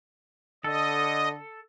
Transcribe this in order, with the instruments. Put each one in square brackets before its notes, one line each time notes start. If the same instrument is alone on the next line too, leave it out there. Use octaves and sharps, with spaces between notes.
[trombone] D3 [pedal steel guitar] A4 [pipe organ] D#5